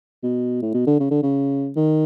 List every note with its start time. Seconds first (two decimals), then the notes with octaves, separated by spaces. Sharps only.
0.24 B2
0.62 A2
0.74 B2
0.87 D3
1.00 C#3
1.11 D3
1.23 C#3
1.76 D#3